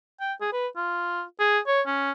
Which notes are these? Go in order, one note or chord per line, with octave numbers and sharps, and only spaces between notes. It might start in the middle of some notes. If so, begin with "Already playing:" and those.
G5
G#4
B4
F4
G#4
C#5
C#4